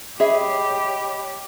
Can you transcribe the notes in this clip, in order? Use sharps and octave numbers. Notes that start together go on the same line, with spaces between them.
G4 G#4 C#5 D#5 E5 B5